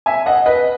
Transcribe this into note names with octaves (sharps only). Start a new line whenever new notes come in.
E5 G#5
D#5 F#5
B4 D#5